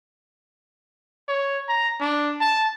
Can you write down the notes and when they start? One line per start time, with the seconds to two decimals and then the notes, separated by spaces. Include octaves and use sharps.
1.29 C#5
1.68 A#5
2.01 D4
2.41 A5